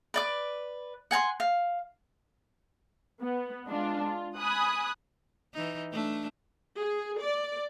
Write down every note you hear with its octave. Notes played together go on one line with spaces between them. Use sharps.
B4 D5 D6
F#5 G#5 A5 C6
F5
B3
G#3 D4 F4
F4
G#5 B5 D#6 F#6
E3 D#4
A3 D4
G#4
D5